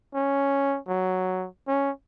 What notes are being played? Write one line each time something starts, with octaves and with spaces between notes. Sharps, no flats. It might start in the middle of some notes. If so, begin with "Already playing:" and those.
C#4
F#3
C#4